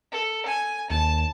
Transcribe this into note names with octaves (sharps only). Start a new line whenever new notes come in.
A4
G#5
D#2 A5